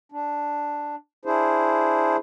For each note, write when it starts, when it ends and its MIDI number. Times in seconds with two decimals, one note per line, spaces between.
0.12 0.95 62
1.25 2.16 62
1.25 2.16 64
1.25 2.16 68
1.25 2.16 72